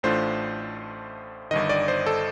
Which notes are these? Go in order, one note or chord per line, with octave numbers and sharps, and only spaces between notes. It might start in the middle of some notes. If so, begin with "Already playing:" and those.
A1 A2 A3 D4 F4 C5
G1 G2 D#3 D#5
D5
C5
A4